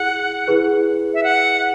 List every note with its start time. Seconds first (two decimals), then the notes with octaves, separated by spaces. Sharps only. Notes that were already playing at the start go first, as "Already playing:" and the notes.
Already playing: E4 G#4 F#5
0.48 E4 G#4 B4
1.14 E5
1.23 F#5